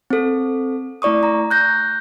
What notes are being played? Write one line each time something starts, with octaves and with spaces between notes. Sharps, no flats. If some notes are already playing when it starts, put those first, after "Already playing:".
C4 A4
A3 E4 D5 C#6 D#6
A#5
F#6 G6 A#6